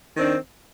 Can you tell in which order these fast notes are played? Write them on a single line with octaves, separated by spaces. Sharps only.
D#3 C4 D4